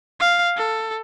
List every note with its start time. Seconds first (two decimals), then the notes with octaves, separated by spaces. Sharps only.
0.20 F5
0.57 A4